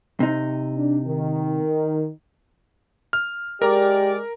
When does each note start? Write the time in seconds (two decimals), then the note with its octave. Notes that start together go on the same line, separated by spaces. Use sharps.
0.20 C3 D#4
0.75 D4
1.07 D#3
3.13 F6
3.62 G#3 G4 A#4 D5 A#5